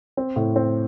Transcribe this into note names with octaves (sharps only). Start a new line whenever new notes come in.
C4
A2
C4